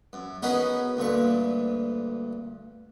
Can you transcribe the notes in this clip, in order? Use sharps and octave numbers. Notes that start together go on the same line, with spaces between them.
F#2
B3 C#4 D#4 F#4 G#4 A#4
D2 G2 A#2 C#6